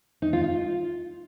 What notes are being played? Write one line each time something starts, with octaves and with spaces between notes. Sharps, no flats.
D#4
F4
F4